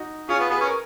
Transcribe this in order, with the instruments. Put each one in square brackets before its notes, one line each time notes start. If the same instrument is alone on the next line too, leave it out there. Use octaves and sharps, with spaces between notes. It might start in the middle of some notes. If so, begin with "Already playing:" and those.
Already playing: [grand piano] D#4 F#4
[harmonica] C#4 [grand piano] F4 G#4
[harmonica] B3
[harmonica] B3 [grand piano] G#4 B4
[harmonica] C#4
[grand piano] A#4